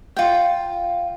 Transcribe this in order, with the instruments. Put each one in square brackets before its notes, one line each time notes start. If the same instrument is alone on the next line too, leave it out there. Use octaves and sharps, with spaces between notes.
[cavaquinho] F4 G5